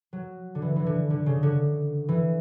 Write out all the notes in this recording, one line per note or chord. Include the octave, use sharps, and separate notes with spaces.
F#3
D3
E3
E3
D3
D3
C#3
D3
E3